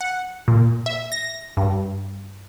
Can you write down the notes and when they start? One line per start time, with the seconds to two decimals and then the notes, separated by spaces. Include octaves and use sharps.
0.01 F#5
0.48 A#2
0.86 E5
1.12 A#6
1.57 G2